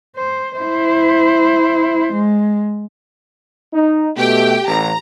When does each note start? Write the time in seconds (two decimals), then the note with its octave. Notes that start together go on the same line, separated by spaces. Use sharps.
0.16 C5
0.59 E4 C5
2.13 G#3
3.73 D#4
4.17 B2 A3 G4 G5
4.67 A1 A#5